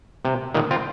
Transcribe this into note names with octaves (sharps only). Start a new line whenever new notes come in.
C3
A#2 D#3
C4 F4